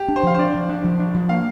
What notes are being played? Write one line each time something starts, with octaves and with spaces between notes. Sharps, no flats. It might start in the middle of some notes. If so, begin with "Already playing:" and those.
Already playing: G4
D4
C5
F3 F5
C5
D4 D5
F3
D4
F3
D4
F3
A#3 F5